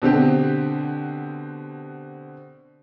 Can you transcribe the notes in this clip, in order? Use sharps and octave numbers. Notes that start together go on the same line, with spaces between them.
B2 D3 C4 G4